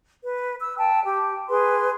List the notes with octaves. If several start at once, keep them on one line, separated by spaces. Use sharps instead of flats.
B4
E6
G5 A5
G4 G5
G#4 B4 C6